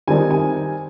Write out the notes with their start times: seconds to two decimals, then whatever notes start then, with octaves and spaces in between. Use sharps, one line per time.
0.08 D#3 G3 C4 D#4 G#5
0.30 G#5